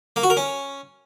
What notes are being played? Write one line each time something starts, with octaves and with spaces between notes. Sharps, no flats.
A#3
F#4
A#4
C#4